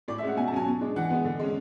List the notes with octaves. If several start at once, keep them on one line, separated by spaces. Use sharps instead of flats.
A2 D5
E5
G#3 C#4 F#5
B2 G#5
A5
F#3 C#4 G#5
B2
G#3 D4
E3 F#5
G#3 B3
D3
G#3 C#4